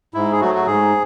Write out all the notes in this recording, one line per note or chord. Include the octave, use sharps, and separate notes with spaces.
G#2 E4
G#4
F#3 A3 F#4
F#4
G#2 G#4